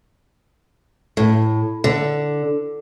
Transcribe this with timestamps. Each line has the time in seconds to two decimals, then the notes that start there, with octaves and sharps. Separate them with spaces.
1.17 A2
1.84 D3